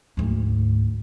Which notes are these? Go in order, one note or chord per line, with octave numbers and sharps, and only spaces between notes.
D2 G#2